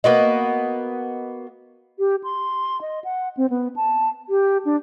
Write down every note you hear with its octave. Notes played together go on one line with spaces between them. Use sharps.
A#3 B3 F#4 D#5
G4
C6
D#5
F#5
C4
B3
A5
G4
D4